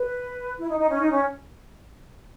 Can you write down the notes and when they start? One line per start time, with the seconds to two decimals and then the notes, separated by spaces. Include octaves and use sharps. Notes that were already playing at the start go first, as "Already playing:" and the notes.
Already playing: B4
0.59 E4
0.69 D#4
0.79 D#4
0.90 C#4
1.01 D#4
1.11 C#4